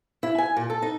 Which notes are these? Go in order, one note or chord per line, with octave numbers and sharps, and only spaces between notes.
E4
G#5
A#2
A4
D#4